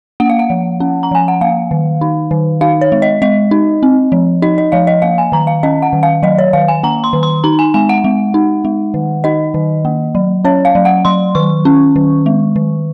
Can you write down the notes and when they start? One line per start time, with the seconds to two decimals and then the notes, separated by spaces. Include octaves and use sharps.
0.20 A#3 F#5
0.30 F5
0.39 F#5
0.50 F3
0.80 C#4
1.03 A#5
1.11 F3 G#5
1.28 F#5
1.41 A#3 F5
1.71 D#3
2.01 D#4
2.31 D#3
2.61 D#4 F5
2.81 C#5
2.92 G#3
3.02 D#5
3.22 G#3 D#5
3.51 D#4
3.83 C4
4.12 F3
4.42 D#4 D#5
4.58 D#5
4.72 F3 F5
4.87 D#5
5.02 A#3 F5
5.18 G#5
5.32 D#3 A#5
5.47 F5
5.63 C#4 D#5
5.82 F#5
5.93 D#3
6.03 F5
6.23 F#3 D#5
6.38 C#5
6.53 D#3 F5
6.68 G#5
6.83 A#3 A#5
7.04 C6
7.13 D#3
7.23 C6
7.44 D#4 A#5
7.59 G#5
7.74 G#3 G#5
7.89 F#5
8.04 G#3
8.34 D#4
8.65 G#3
8.94 D#3
9.24 D#4 D#5
9.54 D#3
9.85 A#3
10.15 F#3
10.45 C#4 C#5
10.65 F5
10.75 F#3
10.85 F#5
11.05 F#3 C6
11.35 D#3 C#6
11.65 C#4
11.96 D#3
12.26 G#3
12.56 D#3